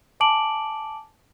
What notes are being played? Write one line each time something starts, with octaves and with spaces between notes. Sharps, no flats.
G#5 A5 D6 D7 F#7